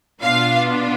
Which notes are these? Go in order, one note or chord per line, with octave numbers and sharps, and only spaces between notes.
B2 B3 D4 F4 F5